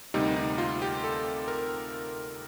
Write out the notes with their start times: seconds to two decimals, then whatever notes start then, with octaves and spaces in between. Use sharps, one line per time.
0.14 D2 C3 G3 A#3 D#4
0.36 D#4
0.58 F4
0.82 G4
1.04 A4
1.48 A#4